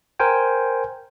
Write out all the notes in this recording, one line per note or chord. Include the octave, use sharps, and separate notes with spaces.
A#4 C5 G5 G#5